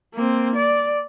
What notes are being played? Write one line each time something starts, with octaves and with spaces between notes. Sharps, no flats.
A#3 C4
D5